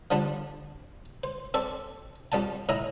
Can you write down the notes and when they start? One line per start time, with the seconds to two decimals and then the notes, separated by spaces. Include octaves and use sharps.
0.11 D3 F3 G3 D4
1.24 C5
1.54 C4 A4 D5 C#6
2.32 F2 G3 G5 A5
2.69 A2 E4 D#5 A#5